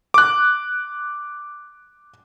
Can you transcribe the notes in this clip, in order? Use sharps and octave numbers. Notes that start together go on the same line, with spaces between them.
D6 F#6